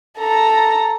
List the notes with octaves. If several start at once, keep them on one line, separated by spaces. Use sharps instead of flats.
A4 A#5